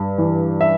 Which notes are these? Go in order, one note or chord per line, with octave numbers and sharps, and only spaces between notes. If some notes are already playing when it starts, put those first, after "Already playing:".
Already playing: G2
E3
E5